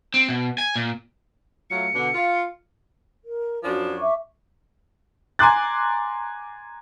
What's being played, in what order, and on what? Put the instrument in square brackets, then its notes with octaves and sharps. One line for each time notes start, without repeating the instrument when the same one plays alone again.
[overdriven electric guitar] C4
B2
G#5
A#2
[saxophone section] F#3 A3 F4 [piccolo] C#7
[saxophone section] B2 D3 D4
F4
[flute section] A#4
[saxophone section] F#2 F3 D4 [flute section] F#4
[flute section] E5 C#6 D6
[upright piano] G#5 A#5 C6 D6 F#6 A6